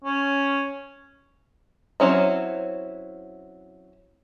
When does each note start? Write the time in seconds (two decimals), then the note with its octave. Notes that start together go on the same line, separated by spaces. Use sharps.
0.04 C#4
2.00 F#3 C4 C#4 E4